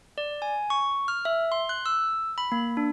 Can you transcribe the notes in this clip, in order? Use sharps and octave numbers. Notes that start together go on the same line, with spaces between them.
D5
G#5
C#6
F6
E5
C6
F#6
E6
B5
A#3
D4